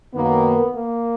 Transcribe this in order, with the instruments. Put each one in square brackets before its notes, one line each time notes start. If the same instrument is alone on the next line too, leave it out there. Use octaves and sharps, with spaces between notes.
[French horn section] F#2 D#3 A#3 [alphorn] B3
[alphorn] A#3